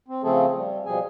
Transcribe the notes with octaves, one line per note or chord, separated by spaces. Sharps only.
C4
C#3 F3 A3 C4 G#4 A4
G3
B2 F3 G3 G#4 G#5